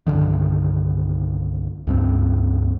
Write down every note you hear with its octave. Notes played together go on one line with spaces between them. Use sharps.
C2 G2 D3 D#3
C#2 G2 C4